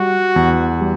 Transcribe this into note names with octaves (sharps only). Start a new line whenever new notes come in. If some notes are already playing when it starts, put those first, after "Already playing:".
Already playing: G3 F#4
E2
G3